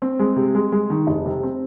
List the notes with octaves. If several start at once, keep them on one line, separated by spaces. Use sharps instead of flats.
C4
G#3
C3
G#3
G#3
D#3
F1
C3
C4